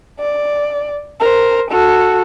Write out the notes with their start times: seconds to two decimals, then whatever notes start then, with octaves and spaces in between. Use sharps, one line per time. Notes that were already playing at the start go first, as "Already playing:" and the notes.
0.20 D5
1.20 A#4 C5
1.71 F#4 A4